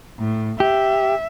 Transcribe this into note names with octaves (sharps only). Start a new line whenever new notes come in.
A2
G4 E5